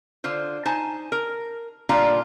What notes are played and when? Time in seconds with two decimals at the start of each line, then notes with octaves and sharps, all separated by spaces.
0.24 D3 F4 C5
0.65 D#4 C5 G#5 A5
1.12 A#4
1.89 A#2 D3 G3 D4 F4 A#5